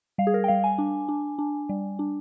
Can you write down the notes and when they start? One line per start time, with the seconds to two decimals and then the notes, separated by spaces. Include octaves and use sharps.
0.18 G3 F5
0.27 G#4
0.34 A#4
0.44 G5
0.48 G3 F5
0.64 G#5
0.78 D4
1.09 D4
1.39 D4
1.69 G3
1.99 D4